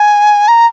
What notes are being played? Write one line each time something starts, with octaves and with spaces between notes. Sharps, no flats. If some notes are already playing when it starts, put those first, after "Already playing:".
Already playing: G#5
A#5